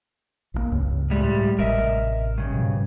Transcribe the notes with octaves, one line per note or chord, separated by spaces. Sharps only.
A#1 C#3 A#3
C#2 G2 C#3
A2 G3 G#3
A1 C3 A#4 D#5 E5
G2 C#3
G#2 B2 F3